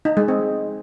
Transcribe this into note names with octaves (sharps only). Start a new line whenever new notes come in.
D#4
G#3
C4